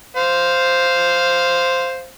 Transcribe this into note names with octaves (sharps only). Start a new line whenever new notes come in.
C5 F5